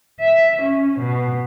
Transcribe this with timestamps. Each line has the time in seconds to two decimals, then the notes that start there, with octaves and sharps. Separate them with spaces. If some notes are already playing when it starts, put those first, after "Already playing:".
0.19 E5
0.61 C#4
0.99 B2